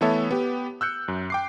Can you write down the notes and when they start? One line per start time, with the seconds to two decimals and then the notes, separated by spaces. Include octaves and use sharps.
0.01 E3 A3 B3 A4 C#5 E5
0.31 B3 G4
0.81 E6 F#6 G6 C#7
1.08 F#2
1.30 G5 D6 C7